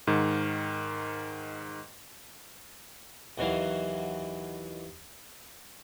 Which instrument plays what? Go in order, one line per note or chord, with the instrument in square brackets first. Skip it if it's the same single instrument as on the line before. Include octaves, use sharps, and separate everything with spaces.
[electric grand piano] G#2 D#3
[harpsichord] D#2 B2 E3 F#3 F5